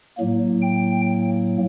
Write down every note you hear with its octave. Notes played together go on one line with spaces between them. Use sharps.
A2 F#3 A#3
G5